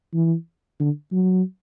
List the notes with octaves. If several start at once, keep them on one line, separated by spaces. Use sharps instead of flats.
E3
D3
F#3